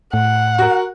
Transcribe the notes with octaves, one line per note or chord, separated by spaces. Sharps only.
A2 F#5
F#4 A#4